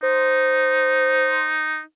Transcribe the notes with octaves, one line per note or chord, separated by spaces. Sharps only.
D#4 C5